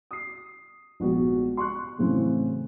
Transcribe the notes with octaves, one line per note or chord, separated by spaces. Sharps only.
D#6 C7
A#1 G#2 B3 F#4
C6 C#6 F#6
F#2 A2 C#3 E3 C4